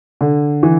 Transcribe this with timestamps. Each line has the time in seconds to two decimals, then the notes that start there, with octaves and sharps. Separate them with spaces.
0.21 D3
0.63 E3